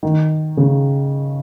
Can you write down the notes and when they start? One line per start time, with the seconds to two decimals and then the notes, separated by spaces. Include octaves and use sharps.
0.03 D#3
0.57 C#3